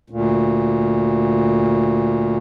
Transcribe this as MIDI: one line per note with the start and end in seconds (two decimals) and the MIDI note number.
0.10 2.37 38
0.10 2.37 46